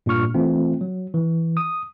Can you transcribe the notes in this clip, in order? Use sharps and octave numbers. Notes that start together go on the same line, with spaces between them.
G2 A#2 D4 C#6 F6
E3 A3 C4 F4
F#3
E3
D#6